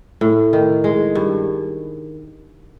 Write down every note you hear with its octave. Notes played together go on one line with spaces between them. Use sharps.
A2
D#3
G#3
G2